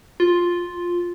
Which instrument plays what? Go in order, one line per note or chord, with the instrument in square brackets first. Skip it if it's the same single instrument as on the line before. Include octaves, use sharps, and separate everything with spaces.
[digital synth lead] F4